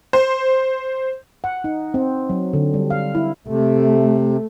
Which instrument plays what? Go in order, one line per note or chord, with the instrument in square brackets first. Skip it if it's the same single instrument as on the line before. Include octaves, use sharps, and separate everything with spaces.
[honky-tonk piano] C5
[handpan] F#5
D#4
C4
F#3
D3
G3
F5
E4
[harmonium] C3 [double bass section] A3